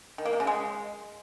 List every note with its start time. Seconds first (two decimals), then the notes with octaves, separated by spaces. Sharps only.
0.18 D#3
0.26 A#3
0.33 C3
0.40 C#3
0.47 G#3